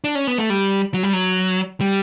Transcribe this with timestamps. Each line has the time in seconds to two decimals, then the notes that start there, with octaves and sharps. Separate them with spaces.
0.04 D4
0.15 C#4
0.27 B3
0.38 A3
0.50 G3
0.94 F#3
1.03 G3
1.13 F#3
1.81 G3